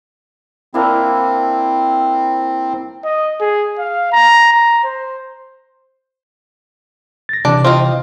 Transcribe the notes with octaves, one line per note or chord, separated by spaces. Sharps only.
A#3 C4 D4 E4
D#5
G#4
F5
A#5
A#5
C5
A6 A#6
C3 E3 D4
C4 F4 D#5